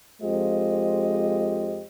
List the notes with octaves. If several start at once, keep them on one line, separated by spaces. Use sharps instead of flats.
F2 G#3 F4 G4 C5 D#5